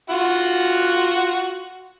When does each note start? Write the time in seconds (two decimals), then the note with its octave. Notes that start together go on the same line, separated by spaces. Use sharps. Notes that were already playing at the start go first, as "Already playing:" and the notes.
0.10 F4 F#4 F#5